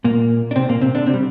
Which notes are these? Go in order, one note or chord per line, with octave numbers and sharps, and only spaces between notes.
A#2 A#3
D4
C3 C4
A#2 A#3
C3 C4
D3 D4
C3 C4
G3